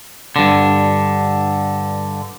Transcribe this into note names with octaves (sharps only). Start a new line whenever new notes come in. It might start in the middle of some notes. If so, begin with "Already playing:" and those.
G2 D3